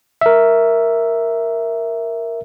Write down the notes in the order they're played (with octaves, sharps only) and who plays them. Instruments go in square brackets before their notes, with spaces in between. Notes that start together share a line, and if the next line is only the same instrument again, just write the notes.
[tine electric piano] A#4 E5